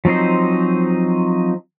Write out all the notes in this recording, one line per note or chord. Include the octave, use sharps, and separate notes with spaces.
F3 F#3 C4 D#4 C5